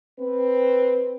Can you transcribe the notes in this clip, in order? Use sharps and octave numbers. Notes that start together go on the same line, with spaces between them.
C4 B4